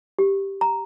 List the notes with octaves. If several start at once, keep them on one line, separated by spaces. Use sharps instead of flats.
G4
A#5